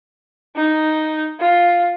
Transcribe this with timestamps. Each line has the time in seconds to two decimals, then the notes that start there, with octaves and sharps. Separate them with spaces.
0.56 D#4
1.40 F4